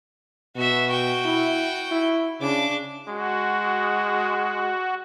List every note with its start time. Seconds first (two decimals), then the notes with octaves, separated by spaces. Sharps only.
0.56 B2 F#4 E5
0.88 F#4 G5
1.25 E4
1.92 E4
2.41 C#3 D4 D6
3.08 G#3 F#4